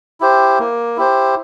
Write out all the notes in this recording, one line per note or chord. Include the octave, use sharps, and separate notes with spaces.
E4 G4 C5
A#3
E4 G4 C5